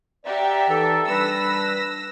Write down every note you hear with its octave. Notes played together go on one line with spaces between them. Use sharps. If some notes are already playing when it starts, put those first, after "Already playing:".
G4 D5 E5 F#5 A#5
E3 D#4 A4
G3 D4 B4 E6 A#6